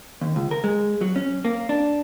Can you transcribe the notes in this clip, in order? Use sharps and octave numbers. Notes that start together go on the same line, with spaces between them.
D#2
C#2
A#4
G#3
F#3
C#4
A#3
D4